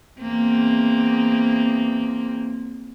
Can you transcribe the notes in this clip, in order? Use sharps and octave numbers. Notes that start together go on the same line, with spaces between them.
E2 A#3 C4